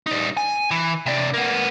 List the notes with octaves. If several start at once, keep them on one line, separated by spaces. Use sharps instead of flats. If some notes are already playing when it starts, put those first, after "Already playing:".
G3 D#4
G#5
E3
C3 D4
A#3 B3